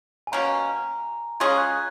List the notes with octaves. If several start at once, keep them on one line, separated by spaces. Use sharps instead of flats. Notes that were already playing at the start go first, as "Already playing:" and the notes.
G#5
B2 A#3 C#4 A#5
G#3 C#4 F4 G#4 G#6
G#6
F#6